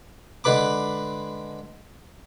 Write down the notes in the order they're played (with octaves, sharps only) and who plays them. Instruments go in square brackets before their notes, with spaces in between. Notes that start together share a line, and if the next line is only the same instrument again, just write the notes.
[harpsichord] D3 G#3 B4 B5 D6